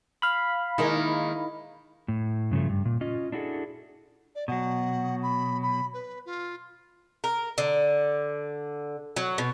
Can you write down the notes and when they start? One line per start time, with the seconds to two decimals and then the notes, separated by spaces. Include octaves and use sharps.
0.22 F5 B5
0.78 D#3 G#3 A#3 D#4 E4 A#4
2.08 A2
2.51 G2 C#3 F3 A3
2.69 G2
2.85 A#2
3.01 C#4 F4 D#5
3.32 D4 E4 F#4 G#4 A4
4.35 D5
4.48 B2 F#3 F#5
5.22 B5
5.63 B5
5.94 B4
6.26 F4
7.24 A#4
7.58 D3
9.16 F#3
9.38 B2